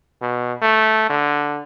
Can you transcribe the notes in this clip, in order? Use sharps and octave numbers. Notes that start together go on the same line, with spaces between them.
B2
A3
D3